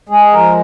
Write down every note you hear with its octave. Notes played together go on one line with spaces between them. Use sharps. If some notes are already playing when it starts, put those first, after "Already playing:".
G#3 G#4
F3 A#4